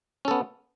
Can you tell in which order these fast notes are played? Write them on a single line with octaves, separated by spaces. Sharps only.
C#4 A4 B3